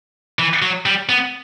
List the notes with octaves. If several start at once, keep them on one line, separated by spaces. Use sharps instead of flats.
E3
F#3
G3
B3